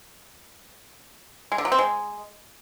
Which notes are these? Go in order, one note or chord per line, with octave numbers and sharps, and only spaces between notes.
G#3
D3
F#3
C4
G#3